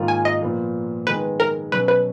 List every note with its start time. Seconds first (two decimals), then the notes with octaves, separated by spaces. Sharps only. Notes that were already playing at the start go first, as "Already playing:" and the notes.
Already playing: G#2 D#3 A#3 F4
0.08 G#5
0.25 D#5
0.41 A#2 F3 B3
1.07 D#3 G#3 B3 B4
1.40 A#4
1.72 B2 F#3 C#4 B4
1.88 B4